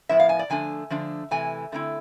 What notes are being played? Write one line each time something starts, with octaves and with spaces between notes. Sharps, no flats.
A2 F3 B3 E4 E5
F5
G#5
D5
D3 F3 A3 D4 G#5
D3 F3 A3 D4
C3 E3 A3 G#5
D3 A3 C4 E4